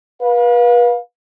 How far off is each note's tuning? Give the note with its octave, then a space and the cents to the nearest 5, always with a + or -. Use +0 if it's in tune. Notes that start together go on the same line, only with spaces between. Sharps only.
B4 -35 F5 +20